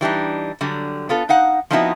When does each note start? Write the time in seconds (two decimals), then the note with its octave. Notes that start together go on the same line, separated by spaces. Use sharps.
0.01 E3 G3 D4 D#4
0.61 D3 F#3 G3
1.09 B3 F4 A4
1.29 D#4 F5 F#5
1.70 F3 B3 C4 D#4 E4 F#4